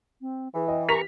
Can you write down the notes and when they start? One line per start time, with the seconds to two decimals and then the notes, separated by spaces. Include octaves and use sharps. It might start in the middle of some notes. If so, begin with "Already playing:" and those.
0.21 C4
0.55 E3 G#4
0.68 D#5 G5
0.89 G4 A#4 A#5 C#6 B6 F7